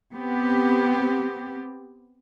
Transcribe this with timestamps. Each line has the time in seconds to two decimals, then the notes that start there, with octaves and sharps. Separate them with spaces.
0.14 B3 C4 G4